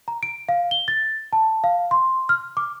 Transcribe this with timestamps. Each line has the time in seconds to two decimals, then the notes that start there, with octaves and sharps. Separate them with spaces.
0.08 A#5
0.23 D7
0.49 F5
0.71 G7
0.88 A6
1.33 A5
1.64 F5
1.91 C6
2.29 F6
2.57 D6